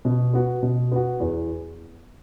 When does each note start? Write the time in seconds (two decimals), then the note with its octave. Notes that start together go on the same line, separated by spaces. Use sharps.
0.05 B2
0.33 B3 F#4
0.62 B2
0.91 B3 F#4
1.20 E2